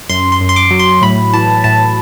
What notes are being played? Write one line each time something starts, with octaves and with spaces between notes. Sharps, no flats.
F#2 C6
C6
F#2
C6
D6
F#3
C6
A2 B5
E3 A5
A2 A5